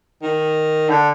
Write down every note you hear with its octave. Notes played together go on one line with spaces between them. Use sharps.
D#3
D3